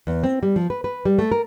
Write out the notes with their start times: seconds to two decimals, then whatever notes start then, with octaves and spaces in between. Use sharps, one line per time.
0.07 E2
0.24 C4
0.43 G3
0.56 F3
0.70 B4
0.84 B4
1.05 G3
1.19 A3
1.31 A#4